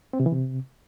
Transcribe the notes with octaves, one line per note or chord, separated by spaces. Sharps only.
C4
C3
E3
C3